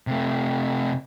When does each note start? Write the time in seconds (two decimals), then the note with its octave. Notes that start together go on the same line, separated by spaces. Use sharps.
0.07 C3 A3